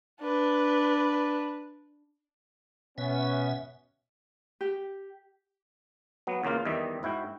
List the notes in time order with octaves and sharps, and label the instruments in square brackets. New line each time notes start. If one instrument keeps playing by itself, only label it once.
[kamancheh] D4 B4
[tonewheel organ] B2 E5 [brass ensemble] B3 C#4
[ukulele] G4
[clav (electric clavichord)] F#3 B3
E2 C#3 A#3 F4 F5
E2 D#3 G3 D#5 E5
G#2 E4 F#4 G5